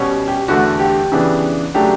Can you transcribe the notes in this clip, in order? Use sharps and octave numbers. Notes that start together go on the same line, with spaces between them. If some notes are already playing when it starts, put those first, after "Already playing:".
Already playing: B2 G3 C#4
G4
E2 D3 A3 F#4
G4
C#3 E3 B3 D4
C#3 F#3 A3 D4 G4